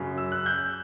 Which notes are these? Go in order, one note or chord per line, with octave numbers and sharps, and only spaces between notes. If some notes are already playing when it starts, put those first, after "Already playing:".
Already playing: F#2 C#3 F#3
E6
F#6
G6